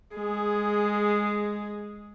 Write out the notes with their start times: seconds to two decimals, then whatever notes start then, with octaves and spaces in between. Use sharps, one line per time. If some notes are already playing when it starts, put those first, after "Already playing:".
0.15 G#3 G#4